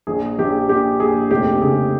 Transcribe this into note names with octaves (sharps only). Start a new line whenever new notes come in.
A#1 G#4
A#1 G4
A#1 G4
A#1 G#4
F1 G4
C#3 G#4